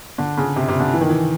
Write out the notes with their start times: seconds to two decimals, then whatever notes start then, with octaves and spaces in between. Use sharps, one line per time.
0.18 D3
0.37 C#3
0.56 C3
0.68 C3
0.80 D3
0.93 E3
1.01 D#3
1.09 E3